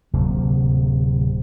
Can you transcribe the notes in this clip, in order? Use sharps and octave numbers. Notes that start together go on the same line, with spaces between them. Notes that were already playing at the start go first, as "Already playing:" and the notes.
D1 C3 F#3 A#3